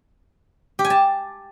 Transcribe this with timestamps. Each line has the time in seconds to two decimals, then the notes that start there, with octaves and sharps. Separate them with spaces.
0.79 G4
0.85 G#5
0.90 A5